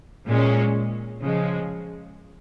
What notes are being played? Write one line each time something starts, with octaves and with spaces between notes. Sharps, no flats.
A#2 G#3 C#4
C#3 F3 G#3